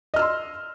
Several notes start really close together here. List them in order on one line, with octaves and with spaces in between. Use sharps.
D#5 F6 E6 C6